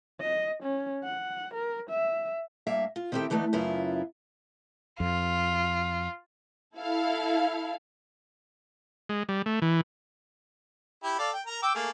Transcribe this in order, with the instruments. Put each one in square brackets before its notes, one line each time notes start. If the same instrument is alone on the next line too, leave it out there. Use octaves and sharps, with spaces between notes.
[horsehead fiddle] D#5
C#4
F#5
A#4
E5
[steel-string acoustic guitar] G2 A#3 E5 F5
F4
D#3 C4 D4 E4 G4 A4
D3 E3 G3 A3 B3 D#4
F#2 C#3 B3 E4 F4
[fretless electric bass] F2 [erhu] F4
[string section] E4 A4 F5
[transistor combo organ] G#3
G3
A3
E3
[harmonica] E4 G4
A4 D5 F5
G5
A#4 A#5
G5 D6 E6
A3 A#3 G#4